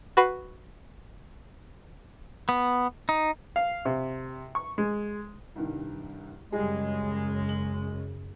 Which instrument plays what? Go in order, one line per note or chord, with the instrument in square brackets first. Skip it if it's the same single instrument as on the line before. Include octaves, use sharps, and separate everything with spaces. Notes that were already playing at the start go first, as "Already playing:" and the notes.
[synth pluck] F#4 B4 C7
[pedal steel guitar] B3
D#4
[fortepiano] F5
C3
C#6
G#3
[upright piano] C2 G2 D#3
[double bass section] F#2 C#3 [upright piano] G3 G#4 [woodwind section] G#3
[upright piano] F#7